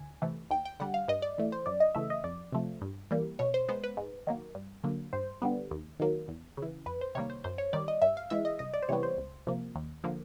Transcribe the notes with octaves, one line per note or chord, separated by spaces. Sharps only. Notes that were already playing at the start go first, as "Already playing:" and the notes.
Already playing: D2 G#5
C3 E3 A3
D#2 G5
G5
D3 G3 F#5
F5
G2 D#5
D5
E3 A3
C5
F#2 D5
D#5
C#3 E3 A3 E5
D#5
F2 D5
C3 F3 A3
G2
E3 G3 A#3
B2 C#5
C5
G#3 B3 C5
B4
G#2
D#3 F#3 A#3
G2
D3 F#3 A#3
G2 C5
D3 G3 B3
D#2
D#3 F#3 A#3
E2
C#3 E3
F2 B4
C5
C3 D#3 G3 A#3 C#5
C5
F#2 C5
C#5
D#3 G3 D5
D#5
G2 E5
F5
E3 G#3 E5
D#5
C2 D#5
D5
C5
C3 E3 G3 B3 C#5
C5
C#2
C3 F3 A#3
D#2
D3 F3 A#3